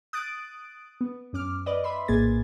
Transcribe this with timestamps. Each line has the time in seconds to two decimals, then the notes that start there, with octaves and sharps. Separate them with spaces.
0.13 D#6 F#6 A6 D7
1.01 B3
1.33 F#2 C#4 D6 F6
1.66 B4 D5 D#5
1.84 B4 E5 B5 C6
2.08 A#1 A2 A#3 G#4 G#6 A6